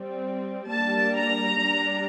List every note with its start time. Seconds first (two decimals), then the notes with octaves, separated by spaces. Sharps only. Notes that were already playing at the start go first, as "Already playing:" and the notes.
Already playing: G3 C4
0.70 G3 A#3 D4 A5
1.16 A#5
1.60 G3 D4